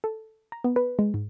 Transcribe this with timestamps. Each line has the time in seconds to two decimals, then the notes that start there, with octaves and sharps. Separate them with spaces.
0.04 A4
0.52 A#5
0.64 B3
0.76 B4
0.99 G#3
1.14 G#2